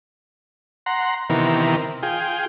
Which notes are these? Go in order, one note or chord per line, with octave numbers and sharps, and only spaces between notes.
F#5 A#5 C6
C3 D#3 E3 B3 A#4
F4 G#4 G5